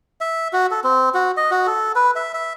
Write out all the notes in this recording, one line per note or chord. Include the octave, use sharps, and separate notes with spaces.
E5
F#4
A4
C4
F#4
D#5
F#4
A4
B4
E5
E5